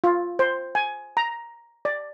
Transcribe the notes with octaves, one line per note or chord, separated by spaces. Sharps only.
F4
C5
G#5
A#5
D5